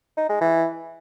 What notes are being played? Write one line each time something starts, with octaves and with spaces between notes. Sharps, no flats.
D#4
G#3
E3